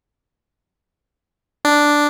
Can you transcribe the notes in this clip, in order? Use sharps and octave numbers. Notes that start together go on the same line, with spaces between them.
D4